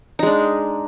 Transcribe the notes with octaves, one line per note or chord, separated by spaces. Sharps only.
G#3 D4 D#4